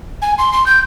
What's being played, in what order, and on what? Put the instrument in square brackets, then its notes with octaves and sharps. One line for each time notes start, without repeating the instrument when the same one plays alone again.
[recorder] G#5
C6
C6
G6